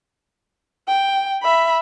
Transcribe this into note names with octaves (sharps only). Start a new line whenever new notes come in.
G5
E5 B5